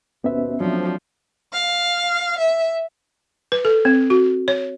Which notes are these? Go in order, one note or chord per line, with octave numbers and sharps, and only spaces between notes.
G#1 D#2 B2 B3 C#4 B4 C5 E5
F3 F#3 A3 C4 D4
F5
E5
B4
A4
C4
F#4
C#5